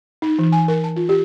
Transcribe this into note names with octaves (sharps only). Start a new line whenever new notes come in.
D#4
E3
G#5
A#4
A5
F4
G4